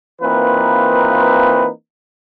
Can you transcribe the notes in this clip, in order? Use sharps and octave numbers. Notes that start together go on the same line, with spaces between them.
E3 A#3 C4 D#4 F4 B4